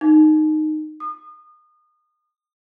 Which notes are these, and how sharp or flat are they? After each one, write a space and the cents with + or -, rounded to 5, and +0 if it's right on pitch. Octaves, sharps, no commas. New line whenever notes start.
D#4 -10
D#6 -30